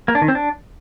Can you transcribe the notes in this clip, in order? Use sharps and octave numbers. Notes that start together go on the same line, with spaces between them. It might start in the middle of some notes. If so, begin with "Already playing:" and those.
A#3
D4
D#3
C4
D4